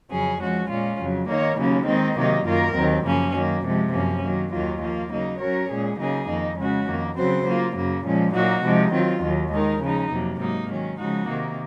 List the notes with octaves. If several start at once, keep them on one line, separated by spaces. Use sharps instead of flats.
F2 C#3 F#3 C#4 G#4
F3 G#3 C#4 F#4
A#2 G#3 C#4 F4
F2 C#3 F#3
D#3 A#3 D#4 A#4 C#5
D#2 C#3 F#3 A#3 C#4
D#3 G#3 C4 D#4
C3 D#3 F#3 A#3 D#4
F#2 D#3 A#3 F4 A#4
D#2 D#3 F#3 C4
F#2 C#3 F3 A#3 C#4
D#3 F#3 A#3
C3 F3 G#3
F#2 F3 A#3 C#4
D#3 F#3 A#3
D#2 D#3 F#3 A#3 F4
F3 A#3 F4
C#3 F#3 A#3 D#4
F#3 C#4 F#4 A#4 C#5
A#2 G#3 C#4 G#4
C#3 F#3 A#3 D#4 G#4
F2 D#3 A#3 D#4
C#3 G#3 C#4 F#4
F2 D#3 A#3
C#3 F#3 C4 F#4 C5
F#3 A#3 F4
F#2 C#3 F#3 A#3
A#2 F3 G#3 C#4
A#2 F#3 A#3 D#4 F#4
C3 F3 G#3 D#4
D#3 F#3 C4 F4
D#2 D#3 F#3
D#3 G#3 D#4 A#4
C#3 F3 G#3 D#4
F2 C3 F#3 A#3
G#2 F#3 A#3 D#4
D#3 F#3 C#4
C#3 F3 G#3 D#4 F#4
C3 D#3 A#3